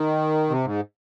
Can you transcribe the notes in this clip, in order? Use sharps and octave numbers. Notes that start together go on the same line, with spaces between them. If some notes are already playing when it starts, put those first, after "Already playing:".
Already playing: D#3
C3
G#2